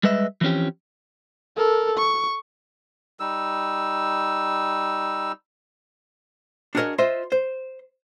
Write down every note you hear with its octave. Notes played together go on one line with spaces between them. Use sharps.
G3 G#3 B4 D#5 E5
E3 F3 C4 C#4 G4
A4 A#4
C#6
G3 D#4 E6
D4 F#4 G#4 A#4 C#5 D#5
F4 C5 D#5 E5
C5